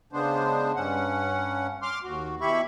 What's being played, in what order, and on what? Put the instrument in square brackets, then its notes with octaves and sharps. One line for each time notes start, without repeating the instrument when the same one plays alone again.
[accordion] C#3 G#3 B3 D4 C5
G2 C#4 F#5
C6 D6 F6
D#2 F#4
B2 E4 G4 E5 B5 C#6